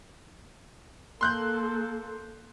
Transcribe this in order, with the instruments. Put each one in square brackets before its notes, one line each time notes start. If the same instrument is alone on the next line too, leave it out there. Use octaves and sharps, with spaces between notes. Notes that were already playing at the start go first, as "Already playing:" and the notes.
[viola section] A#3 A4 [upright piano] C6 F#6 G6